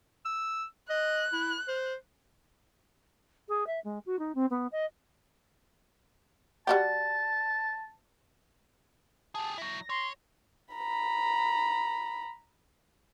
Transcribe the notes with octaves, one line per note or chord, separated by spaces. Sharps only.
E6
D#5 F#6
E4
C5
G#4
E5
G#3
F#4
D#4
C4
B3
D#5
G3 F#4 G4 A5
G4 G#4 A5
F#3 E4 A#6
C#5 C6
A#5 B5